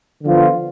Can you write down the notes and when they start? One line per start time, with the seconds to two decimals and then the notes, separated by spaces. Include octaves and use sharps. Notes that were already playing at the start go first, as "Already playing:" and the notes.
0.23 D3 F3 B3 F4